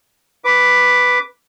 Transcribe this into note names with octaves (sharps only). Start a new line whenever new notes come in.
B4 D6